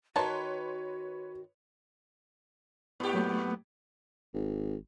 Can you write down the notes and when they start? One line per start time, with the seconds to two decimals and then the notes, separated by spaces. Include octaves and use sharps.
0.16 D#3 F#4 B4 C#5 A5 C6
3.00 G#2 B3 G4
3.13 F#3 A3 A#3
4.34 G#1